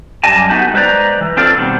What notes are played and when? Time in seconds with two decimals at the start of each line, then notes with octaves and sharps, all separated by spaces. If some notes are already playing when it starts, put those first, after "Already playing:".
0.24 F#2 G3 D#5 G#5 A5
0.49 A3 B3 D#4 F#4 G4
0.74 G#3 B4 C5 D5 A#5
1.21 E3
1.37 C4 D4 F4 A4
1.57 B2 D#3 G3 C4